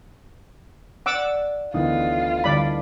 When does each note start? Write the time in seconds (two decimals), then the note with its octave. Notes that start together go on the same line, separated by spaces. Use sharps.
1.06 D5 F#5 D6 E6
1.74 D2 D#3 E3 B3 F4 D#6 F#6
2.44 D3 G3 D5 B5